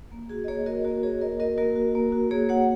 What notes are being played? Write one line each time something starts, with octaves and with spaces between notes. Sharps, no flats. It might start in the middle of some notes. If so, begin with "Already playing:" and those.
A#3
F#4 G#4
D#5
A#3 G#4 C#5
F#4 A#4 D#5
A#3 F#4 A#4
F#4 G#4 C#5
A#3 A#4 D#5
F#4 A#4 D#5
A#3 F#4 A#4
F#4
A#3
F#4
A#3 G#4 C#5
F#4 C#5 F#5